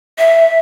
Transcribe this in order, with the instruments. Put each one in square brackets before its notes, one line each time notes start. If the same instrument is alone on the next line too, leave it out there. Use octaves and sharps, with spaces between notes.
[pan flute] E5